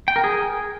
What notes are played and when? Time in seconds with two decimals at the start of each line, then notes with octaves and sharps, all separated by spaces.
0.08 G5
0.16 A#4
0.24 G#4